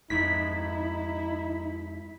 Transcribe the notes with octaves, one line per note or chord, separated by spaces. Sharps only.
F2 G#2 D#4 E4 B6